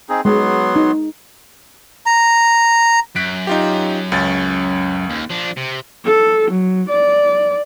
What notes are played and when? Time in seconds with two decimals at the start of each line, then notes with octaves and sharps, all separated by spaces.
0.09 C4 D#4 G#4
0.25 F#3 G#3 B3 C6
0.76 D#4
2.06 A#5
3.16 F#2 F#6 B6 D7
3.47 D#4 F4 G4
4.12 C#2 C#4 A6
5.10 D#2
5.30 F3 D4
5.57 C3
6.05 A4
6.51 F#3
6.89 D5